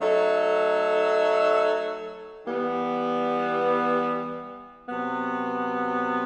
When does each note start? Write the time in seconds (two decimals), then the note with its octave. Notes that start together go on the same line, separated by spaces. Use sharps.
0.01 F#3 A3 D#4 A4
2.45 E3 G3 B3
4.88 C3 F#3 B3